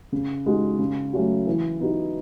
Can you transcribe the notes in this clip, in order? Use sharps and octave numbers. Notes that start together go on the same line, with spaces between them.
C#3
G#3 D#4 F#4
C#3
F#3 A3 C#4 F#4
E3
B3 D#4 F#4